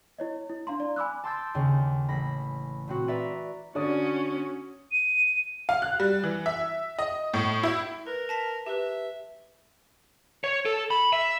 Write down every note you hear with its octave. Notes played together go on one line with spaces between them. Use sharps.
E4 C#5 D#5
E4
D4 F5 A#5 C6
D5
G#5 B5 D6 E6 F#6
A5 C6 D6 E6 G6 A6
D#2 C#3
A1 B5 A#6
A#2 C4 F#4
B4 D5 E5 A#5
D3 C#4 F#4 D5 D#6
D#7
F5
F#6
G3
E3
E5
D#5
A2
E4
A#4 B4
A5 A#6 B6
G4 B4 E5
C#5
A4
B5
E5